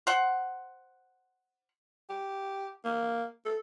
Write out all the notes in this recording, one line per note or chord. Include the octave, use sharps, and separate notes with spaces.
C5 F#5
G4
A#3
A4